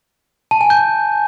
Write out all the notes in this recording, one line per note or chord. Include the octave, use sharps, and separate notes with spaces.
A5
G#5
G6